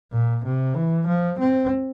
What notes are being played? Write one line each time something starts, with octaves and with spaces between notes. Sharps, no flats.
A#2
C3
E3
F3
C4